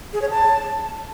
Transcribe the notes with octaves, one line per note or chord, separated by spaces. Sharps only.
G#4
C#5
A5